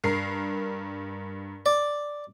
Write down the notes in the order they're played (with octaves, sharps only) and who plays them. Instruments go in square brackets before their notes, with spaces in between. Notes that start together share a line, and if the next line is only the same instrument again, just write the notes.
[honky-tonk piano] G2 A#4 C7
[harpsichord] D5